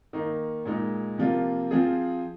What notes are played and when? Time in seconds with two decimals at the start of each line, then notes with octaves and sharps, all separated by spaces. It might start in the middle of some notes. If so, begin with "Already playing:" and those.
0.13 D#3 A#3 D#4
0.65 A#2 G#3 D#4
1.18 C3 F3 A#3 F4
1.71 F3 C4 F4 G#4